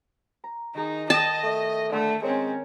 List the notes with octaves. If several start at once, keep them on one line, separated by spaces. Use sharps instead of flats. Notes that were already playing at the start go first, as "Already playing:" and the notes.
A#5
D#3 D#4 G#4
D#5 G5 A5 D#6
A3
D3 A3
G#3 C4 C#4 A#4 C#5